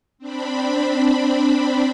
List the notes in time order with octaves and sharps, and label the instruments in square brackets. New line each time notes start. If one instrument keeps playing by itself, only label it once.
[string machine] C4 D4 B5